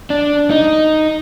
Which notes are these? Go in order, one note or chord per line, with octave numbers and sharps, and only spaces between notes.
D4
D#4